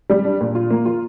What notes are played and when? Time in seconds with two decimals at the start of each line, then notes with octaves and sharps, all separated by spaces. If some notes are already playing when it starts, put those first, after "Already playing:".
0.10 G3
0.25 D4
0.41 A#2
0.55 F4
0.70 A#3
0.86 F4